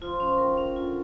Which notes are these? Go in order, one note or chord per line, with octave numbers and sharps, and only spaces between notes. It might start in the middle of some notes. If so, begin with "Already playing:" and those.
F3 F4
F3 C#4
D#3 A#4
C#4
D3 F4